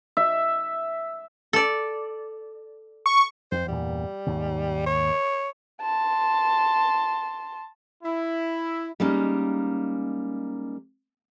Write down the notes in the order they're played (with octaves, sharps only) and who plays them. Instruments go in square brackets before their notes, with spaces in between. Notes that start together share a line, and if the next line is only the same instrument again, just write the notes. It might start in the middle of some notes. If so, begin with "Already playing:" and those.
[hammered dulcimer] E5
[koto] A4 D5
[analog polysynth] C#6
[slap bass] F2 [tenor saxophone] C5
[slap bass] E2 G2 A#2 [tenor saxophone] G3
[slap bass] D#2 G#2
[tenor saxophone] C#5
[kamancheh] A5 C6
[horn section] E4
[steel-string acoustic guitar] G3 G#3 A#3 C#4 D#4